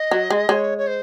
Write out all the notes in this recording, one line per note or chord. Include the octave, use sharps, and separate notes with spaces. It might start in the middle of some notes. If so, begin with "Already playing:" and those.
Already playing: D#5
F#3
G#3
G#3 C#5
C#5
C5